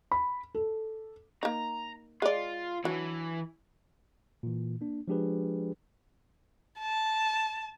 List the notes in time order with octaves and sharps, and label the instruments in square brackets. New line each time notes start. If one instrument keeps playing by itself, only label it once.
[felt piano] B5
A4
[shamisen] A#3 D#4 [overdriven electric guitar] A#5
[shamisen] G#3 D5 [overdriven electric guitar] F4
[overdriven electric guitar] E3 [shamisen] F#3 D4
[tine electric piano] A#2 E3
A#3 D4
F3 G#3 D4 G4 G#4 B4
[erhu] A5